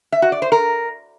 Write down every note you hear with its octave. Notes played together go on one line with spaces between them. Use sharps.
E5
F#4
D5
C5
A#4